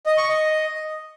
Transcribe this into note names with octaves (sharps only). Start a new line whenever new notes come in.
D#5
C#6
D#5